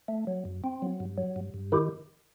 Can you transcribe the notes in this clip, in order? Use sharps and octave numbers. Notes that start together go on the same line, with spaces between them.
A3
F#3
F#2
C4
F#3
G2
F#3
G2
G2
D#3 E4 G4